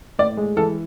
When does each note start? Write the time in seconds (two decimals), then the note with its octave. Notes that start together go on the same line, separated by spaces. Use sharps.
0.19 A2 D5
0.37 G#3
0.57 E3 A4